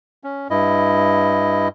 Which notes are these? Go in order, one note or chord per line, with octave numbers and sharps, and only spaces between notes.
C#4
G2 E4 D#5